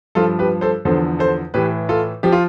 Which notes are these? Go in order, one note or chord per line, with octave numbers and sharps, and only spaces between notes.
G2 F3 F4 A4
G4 B4
A4 C5
E2 D3 F3 A4 C5
A4 C5
A2 E3 G4 B4
F4 A4
F3 G4
F4